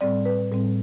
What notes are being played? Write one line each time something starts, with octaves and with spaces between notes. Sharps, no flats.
A2 G3 C4 D5
B4
A2 G3 C4